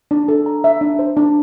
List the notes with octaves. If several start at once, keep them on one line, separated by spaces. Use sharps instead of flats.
D4
A4
A#5
E5
D4
C5
D4